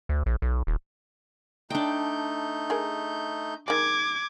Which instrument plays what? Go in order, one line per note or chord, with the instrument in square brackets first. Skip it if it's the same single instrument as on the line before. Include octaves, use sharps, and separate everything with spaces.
[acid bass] D2
A#1
B1
D#1
[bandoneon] A3 D#4 G6 [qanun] D4 G5
[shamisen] G#4 A#4
[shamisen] D#3 G#3 [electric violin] D6 G#6